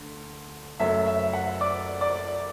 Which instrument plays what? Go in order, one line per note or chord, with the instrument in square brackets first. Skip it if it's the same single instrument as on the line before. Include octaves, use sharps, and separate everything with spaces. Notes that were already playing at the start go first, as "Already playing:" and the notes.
Already playing: [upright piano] D2 D3
F#1 F#2 F#3 A3 E5
E5
F#5
D5 D6
D5 D6